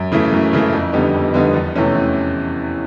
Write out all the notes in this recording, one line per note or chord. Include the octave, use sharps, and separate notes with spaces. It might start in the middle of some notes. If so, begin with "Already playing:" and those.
Already playing: F#2
C#3 E3 A3
F#2
C#3 E3 A3
F2
D3 G3 B3 D#4
F2
D3 G3 B3 D#4
E2
C3 E3 A3 C#4
E2